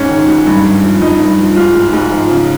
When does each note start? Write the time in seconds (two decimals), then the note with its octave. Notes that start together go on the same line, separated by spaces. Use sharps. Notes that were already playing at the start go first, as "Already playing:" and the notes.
Already playing: G#2 C#4
0.09 D#3
0.28 G#2
0.47 G2
0.64 G2
0.84 F3
1.02 G2 D#4
1.19 G2
1.39 F3
1.56 G#2 F4
1.75 G#2
1.93 G#2
2.12 F3
2.30 C#3